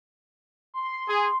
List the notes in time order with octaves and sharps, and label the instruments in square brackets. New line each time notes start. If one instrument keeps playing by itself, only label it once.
[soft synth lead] C6
[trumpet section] G#4